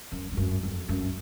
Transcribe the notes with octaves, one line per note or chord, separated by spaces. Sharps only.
F#2
F2
F#2
F2
F#2